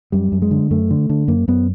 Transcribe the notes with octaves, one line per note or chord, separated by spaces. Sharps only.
F#2 G3
F#2
G#3
D3
F#2 A3
D3
D3
F#2 A#3
F#2 B3